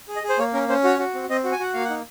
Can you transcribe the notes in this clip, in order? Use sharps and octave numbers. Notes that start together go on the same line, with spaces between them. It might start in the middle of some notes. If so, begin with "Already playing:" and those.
G#4
D#5
G#4
C5
A#3 C#5
C#4 A#4
C#4 C5
F#4 C#5
F#4
C4
C4 D#5
F#4
G#5
F#4 F#5
A#3 F5
F#5
D#4